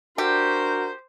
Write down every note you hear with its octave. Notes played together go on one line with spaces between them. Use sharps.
D4 F#4 G4 A#4 C5